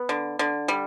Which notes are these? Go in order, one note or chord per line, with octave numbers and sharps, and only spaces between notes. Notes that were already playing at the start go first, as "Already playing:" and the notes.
Already playing: B3
D3
D3
G3